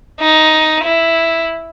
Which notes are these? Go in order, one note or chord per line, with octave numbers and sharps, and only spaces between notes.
D#4
E4